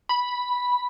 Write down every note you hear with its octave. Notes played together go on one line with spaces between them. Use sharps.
B5